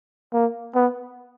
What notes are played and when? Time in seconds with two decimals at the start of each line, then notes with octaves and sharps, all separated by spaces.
0.33 A#3
0.75 B3